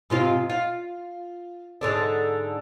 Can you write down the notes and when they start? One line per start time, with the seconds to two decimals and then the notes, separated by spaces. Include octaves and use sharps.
0.10 G#2 C3 F4
0.50 F4
1.81 G#2 D3 D4